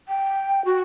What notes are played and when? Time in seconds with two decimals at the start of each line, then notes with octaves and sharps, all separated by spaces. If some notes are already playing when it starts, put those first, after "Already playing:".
0.08 G5
0.65 F#4